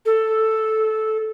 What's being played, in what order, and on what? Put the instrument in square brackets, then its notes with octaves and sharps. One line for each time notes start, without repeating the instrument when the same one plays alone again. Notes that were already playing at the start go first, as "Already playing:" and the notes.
[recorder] A4